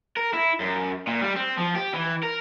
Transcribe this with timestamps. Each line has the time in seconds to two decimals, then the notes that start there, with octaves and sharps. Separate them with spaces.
0.17 A#4
0.34 E4
0.60 F#2
1.07 A#2
1.22 G3
1.36 C4
1.57 F3
1.75 G4
1.94 E3
2.23 A#4